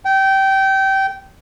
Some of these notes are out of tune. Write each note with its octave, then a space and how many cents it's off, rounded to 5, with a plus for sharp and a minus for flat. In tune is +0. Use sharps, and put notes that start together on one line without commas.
G5 -20